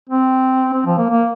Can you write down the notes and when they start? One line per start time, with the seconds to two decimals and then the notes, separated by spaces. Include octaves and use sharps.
0.09 C4
0.74 C4
0.86 F3
0.98 A#3
1.10 A#3